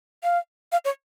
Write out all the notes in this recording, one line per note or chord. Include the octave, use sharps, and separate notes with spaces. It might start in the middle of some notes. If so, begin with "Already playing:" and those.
F5
F5
C#5